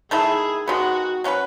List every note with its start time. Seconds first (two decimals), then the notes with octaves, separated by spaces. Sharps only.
0.11 D#3 A3 E4 G#4
0.68 D#3 G#3 B3 F#4
1.24 F#3 C#4 F#4 B4